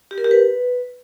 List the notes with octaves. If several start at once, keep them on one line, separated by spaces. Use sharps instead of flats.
G4
A#4
G4
B4